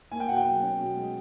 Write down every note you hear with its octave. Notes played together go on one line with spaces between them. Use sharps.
A#3 G#5
G5
B2 F#5
G5
F#3
C#4
B2
G#3